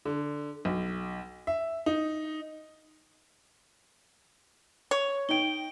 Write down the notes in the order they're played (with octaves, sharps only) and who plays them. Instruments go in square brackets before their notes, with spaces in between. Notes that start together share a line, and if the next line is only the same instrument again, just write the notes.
[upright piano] D3
B1
E5
D#4
[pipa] C#5
[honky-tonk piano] D#4 G5 [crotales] D7 G7